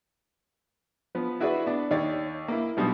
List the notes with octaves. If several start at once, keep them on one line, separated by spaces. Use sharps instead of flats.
F3 B3
E4 F#4 G#4 B4 D5 E5
B3 D4
D#2 G4 C#5 D5
A#3 E4
B1 B2 G3 B3 D#6